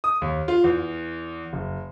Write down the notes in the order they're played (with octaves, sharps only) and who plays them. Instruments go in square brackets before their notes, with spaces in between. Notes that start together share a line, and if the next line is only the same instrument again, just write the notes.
[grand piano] D#6
D#2
F4
E2
F#1